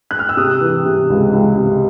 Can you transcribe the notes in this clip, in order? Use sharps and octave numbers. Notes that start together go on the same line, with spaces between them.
F#6
F6
E6
C3 D#6
E3
C3
C#2
C#2
C3